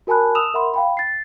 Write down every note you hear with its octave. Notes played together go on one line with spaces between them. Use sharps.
F#4 A#4 G#5 A5 B5 F#6
D#6 E6 E7 F7
A#4 E5 F#5 B5 C6
F5 G5 B5
A6 C7